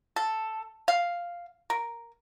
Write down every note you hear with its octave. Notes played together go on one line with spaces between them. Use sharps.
A4
F5
A#4